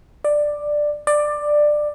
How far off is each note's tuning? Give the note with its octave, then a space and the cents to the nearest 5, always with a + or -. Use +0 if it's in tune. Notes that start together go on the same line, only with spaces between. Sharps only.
D5 +10
D5 +15